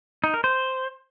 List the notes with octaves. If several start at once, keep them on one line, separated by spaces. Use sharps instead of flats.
D#4
A#4
C5